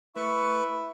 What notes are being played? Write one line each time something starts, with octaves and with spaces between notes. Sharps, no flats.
A3 E4 B4 C#6